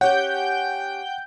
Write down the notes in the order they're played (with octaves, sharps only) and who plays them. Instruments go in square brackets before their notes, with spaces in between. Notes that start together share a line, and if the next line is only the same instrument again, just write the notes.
[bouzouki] C#4 G4 [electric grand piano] F#5 [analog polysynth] G5 G6